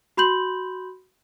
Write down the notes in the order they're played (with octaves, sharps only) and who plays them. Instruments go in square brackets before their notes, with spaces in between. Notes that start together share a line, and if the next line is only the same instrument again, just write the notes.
[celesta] F#4 B5 C6 G6 F#7